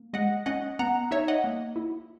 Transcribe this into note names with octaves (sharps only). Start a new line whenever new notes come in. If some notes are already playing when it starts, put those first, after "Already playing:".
Already playing: A#3
G#3 D#5 F#5
C#4 D#5 F#5
B3 F#5 A#5
D#4 C#5 E5
D#5 F#5
A#3
E4